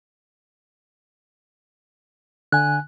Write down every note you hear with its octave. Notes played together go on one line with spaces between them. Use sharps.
D3 G#5 F#6